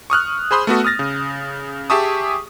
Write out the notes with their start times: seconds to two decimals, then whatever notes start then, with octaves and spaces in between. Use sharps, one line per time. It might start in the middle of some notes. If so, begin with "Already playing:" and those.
0.10 C#6 D#6 F6 F#6
0.51 G#4 C5 B5 C6 D#6
0.67 A3 B3 F#4 A4
0.84 D#6 F6 A6 A#6
0.99 C#3
1.90 G4 G#4 E5 A5 C#6 D#6